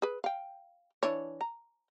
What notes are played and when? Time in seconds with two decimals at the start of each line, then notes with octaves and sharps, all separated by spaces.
0.02 G#4 B4
0.24 F5 G5
1.03 E3 D4 C#5
1.41 A#5